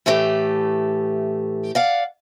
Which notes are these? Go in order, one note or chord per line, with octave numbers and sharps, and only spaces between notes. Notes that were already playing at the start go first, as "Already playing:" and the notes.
A2 E3 A3 G4 A4
D5 F5 F#5